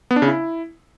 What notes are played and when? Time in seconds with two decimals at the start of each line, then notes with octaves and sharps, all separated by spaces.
0.11 B3
0.16 D4
0.22 C#3
0.28 E4